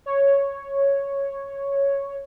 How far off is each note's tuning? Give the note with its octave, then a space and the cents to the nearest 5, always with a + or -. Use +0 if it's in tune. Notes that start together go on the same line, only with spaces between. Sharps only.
C#5 +0